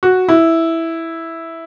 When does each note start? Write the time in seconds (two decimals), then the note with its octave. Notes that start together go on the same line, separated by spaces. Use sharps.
0.03 F#4
0.29 E4